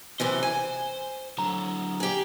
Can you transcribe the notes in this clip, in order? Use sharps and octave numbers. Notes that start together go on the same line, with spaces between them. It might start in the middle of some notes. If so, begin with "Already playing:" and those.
F#2 C3 E3 C5
G#5
D3 F#3 A#5
G4 G#4